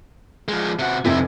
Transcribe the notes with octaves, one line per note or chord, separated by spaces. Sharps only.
F3 G#3
C3 F#4
F1 F2 C3 E4 G#6